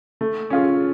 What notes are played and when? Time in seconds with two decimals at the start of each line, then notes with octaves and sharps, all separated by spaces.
0.21 A3
0.50 C#4 F4 G#4